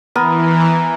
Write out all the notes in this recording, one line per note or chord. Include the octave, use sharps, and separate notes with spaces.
E3 B3 A#4 D#6